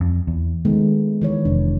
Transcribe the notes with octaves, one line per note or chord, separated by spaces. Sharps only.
F2
E2
D#3 G#3 A3 B3
D#3 E3 C#5
F1 D4